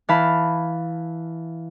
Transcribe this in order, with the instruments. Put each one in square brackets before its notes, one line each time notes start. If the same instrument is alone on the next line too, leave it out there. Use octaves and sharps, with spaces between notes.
[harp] E3 F5 A5 B5